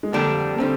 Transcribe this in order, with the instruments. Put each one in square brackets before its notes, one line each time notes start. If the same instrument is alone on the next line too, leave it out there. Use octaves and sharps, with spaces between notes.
[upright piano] G#3
[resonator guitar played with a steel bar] F2 D3 G3 D4 [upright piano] A#3
[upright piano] A#3
[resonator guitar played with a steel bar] D3 G3 [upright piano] C4